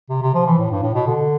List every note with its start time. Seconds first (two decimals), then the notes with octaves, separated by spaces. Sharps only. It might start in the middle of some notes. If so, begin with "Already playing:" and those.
0.10 C3
0.22 C3
0.34 F3
0.46 E3
0.58 A2
0.71 G2
0.82 A2
0.94 B2
1.07 D3